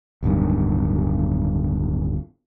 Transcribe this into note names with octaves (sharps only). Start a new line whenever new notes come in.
D1 B1 G2 D#3